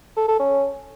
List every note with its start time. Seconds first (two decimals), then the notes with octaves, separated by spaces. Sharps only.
0.17 A4
0.28 A4
0.40 C#4